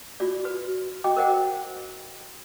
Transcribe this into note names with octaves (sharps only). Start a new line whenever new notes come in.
F4 F#4 D5
F#4 B4
F#4 D#5 G5 D6
A#4 C5 D#5 F#5 G5